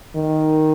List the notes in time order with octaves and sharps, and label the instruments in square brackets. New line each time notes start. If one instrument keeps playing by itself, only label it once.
[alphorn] D#3